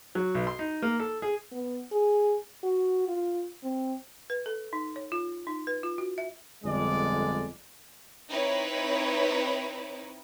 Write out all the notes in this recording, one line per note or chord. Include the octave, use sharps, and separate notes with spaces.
F#3
B1
C6
D#4
A#3
A4
G#4
B3
G#4
F#4
F4
C4
B4
A4
D#4
C#5
F4
D#4
B4
F4
F#4
E5
G1 F2 D3 G#3 D4 D5
C4 D#4 E4 B4 C#5